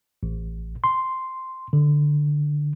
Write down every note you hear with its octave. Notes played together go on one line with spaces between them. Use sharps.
A1
C6
D3